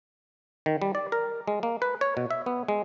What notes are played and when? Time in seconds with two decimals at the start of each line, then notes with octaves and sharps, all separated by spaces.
0.66 D#3
0.82 G3
0.95 D5
1.12 A#4
1.48 G#3
1.63 A#3
1.82 B4
2.01 C#5
2.17 B2
2.31 E5
2.46 B3
2.68 G#3